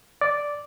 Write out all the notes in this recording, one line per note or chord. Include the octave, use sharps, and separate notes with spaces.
D5